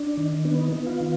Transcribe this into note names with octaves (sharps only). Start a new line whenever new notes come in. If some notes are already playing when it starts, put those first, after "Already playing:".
Already playing: D4
D#3
B3 D4
D#4
B3 D#4
F4
D#3